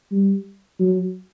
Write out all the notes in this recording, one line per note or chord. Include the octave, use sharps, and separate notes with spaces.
G3
F#3